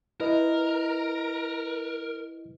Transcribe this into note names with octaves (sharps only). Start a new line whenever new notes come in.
E4 A#4 B4 D#5